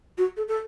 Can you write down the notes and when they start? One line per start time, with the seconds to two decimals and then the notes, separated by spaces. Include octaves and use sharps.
0.18 F#4
0.37 A4
0.48 A4